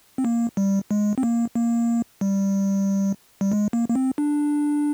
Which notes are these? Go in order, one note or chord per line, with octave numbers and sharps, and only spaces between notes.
C4
A#3
G3
G#3
C4
A#3
A#3
G3
G3
G#3
A#3
A#3
C4
D4